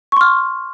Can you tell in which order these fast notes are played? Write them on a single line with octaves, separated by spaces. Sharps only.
C#6 C6 F6